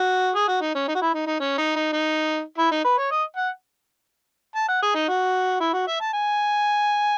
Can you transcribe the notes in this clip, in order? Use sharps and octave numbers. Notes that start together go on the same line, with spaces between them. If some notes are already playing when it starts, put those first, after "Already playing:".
Already playing: F#4
G#4
F#4
D#4
C#4
D#4
F#4
E4
D#4
D#4
C#4
D#4
D#4
D#4
E4
D#4
B4
C#5
D#5
F#5
A5
F#5
G#4
D#4
F#4
E4
F#4
E5
A5
G#5